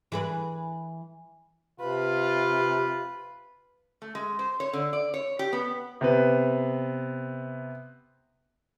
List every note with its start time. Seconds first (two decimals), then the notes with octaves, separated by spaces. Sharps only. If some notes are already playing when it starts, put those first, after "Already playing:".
0.12 E3 G#4 B4
1.80 C3 F4 B4
4.02 A3
4.15 G#3
4.39 C5
4.60 C#5
4.73 D3
4.93 D5
5.14 C#5
5.39 G4
5.53 B3
6.01 C3 B3 B4